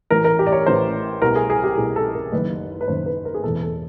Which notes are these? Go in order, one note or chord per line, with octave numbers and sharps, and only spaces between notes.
A1 A2 E3 A#4
A#4
G4
D5
C#5
A1 A2 E3 C5
C2 B2 A#4
G#4
G#4
G4
C2 B2 G#4
A4
A#4
F#1 F#2 D#3 B4
B4
F#1 F#2 D#3 C5
B4
A#4
G#4
E1 E2 B2 A4
A4